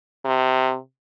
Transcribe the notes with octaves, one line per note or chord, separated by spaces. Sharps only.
C3